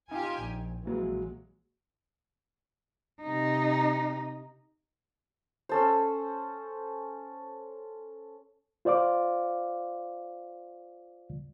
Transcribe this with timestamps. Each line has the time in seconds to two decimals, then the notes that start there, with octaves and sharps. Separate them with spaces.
0.11 D#4 F4 G4 G#5
0.41 A#1
0.85 A#1 A#2 E3 F#3 G#3
3.22 C3 D#4
5.69 C#4 A4 C5
8.85 F4 C5 D5 F5 D6